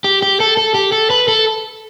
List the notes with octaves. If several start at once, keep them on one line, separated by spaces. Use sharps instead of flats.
G4
G4
A4
A4
G4
A4
B4
A4